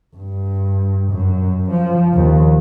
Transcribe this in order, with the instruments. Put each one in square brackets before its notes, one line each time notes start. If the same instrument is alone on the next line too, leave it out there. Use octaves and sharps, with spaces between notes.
[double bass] G2
F#2
F3
D#2